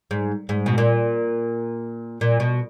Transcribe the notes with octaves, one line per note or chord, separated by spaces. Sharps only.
G#2
G#2
B2
A#2
A#2
B2